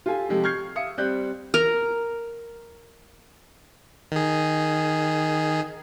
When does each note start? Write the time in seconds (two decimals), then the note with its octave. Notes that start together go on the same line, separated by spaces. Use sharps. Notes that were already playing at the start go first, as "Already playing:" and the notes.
0.06 F4 G4 A4 G#5
0.29 C3 F3 G#3 G4 A4
0.44 C#6 F6 G6 G#6 C7
0.75 E5 F5 D#6 C#7
0.98 G3 C4 D5 F#6 G6
1.54 A#4
4.12 D#3 G#4